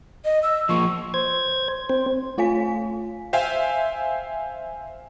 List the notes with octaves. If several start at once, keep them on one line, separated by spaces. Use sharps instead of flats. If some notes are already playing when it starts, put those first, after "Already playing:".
D#5
E6
F3 A#3 C#6
C5 G#6
C4 C5
A3 F4 C#5 F5 G#5 B6
C5 E5 F5 G5 G#5